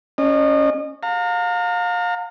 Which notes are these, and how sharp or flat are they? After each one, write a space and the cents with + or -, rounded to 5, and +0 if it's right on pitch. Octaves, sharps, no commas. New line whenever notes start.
C#4 +0 D#5 -35
F5 +30 A#5 -35